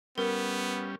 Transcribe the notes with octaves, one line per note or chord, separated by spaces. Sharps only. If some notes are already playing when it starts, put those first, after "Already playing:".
G3 B3 C#4 A#4